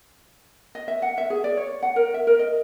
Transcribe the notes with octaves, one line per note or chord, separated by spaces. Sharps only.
D#5
E5
F#5
E5
G#4
D5
C#5
F#5
A#4
E5
A#4
D#5